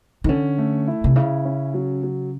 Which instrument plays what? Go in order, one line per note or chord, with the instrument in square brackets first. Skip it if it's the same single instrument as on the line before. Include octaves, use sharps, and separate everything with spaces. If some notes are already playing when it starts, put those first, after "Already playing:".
[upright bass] D#3
[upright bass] D3 [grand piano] C#4
[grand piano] A3
E4
[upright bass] C3
[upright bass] C#3 [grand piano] E4
[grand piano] C#4
F#3
F#3